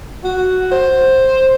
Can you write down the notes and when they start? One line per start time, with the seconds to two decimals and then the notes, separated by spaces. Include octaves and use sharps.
0.24 F#4
0.71 C5